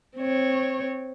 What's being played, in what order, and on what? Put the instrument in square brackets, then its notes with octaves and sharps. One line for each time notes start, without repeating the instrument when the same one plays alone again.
[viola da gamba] C4 C#5